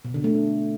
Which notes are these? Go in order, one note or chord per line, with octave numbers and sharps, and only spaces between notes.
B2
D3
A3